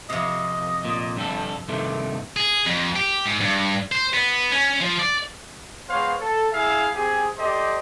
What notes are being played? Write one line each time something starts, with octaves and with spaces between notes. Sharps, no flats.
F2 C3 D#5
A#2
G2 G3 A4
G2 C3 D#3 A3
G#4
F2
G4
G#2
G2
C5
B3
C#4
F3
D5
G#3 B3 C5 C#5 F5
A4
E4 G#4 E5 F5
C4 G4 G#4
G4 A4 C5 D5 D#5